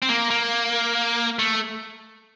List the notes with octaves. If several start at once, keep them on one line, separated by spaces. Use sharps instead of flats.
C4
A#3
A#3
A3